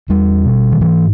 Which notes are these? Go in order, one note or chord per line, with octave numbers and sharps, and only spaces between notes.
E2 G3
B2
D#3
G#2 E3